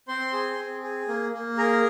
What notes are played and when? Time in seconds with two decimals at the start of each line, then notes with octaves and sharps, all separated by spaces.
0.08 C4 C5 C6
0.33 G#4
0.58 C4
0.83 G#4
1.08 A#3
1.33 A#3
1.57 G#4 A#4 A#5